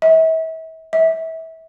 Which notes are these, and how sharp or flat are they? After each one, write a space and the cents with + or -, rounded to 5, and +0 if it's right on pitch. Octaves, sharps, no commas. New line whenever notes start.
E5 -40
E5 -25